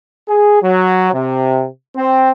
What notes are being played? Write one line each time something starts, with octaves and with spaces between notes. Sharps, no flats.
G#4
F#3
C3
C4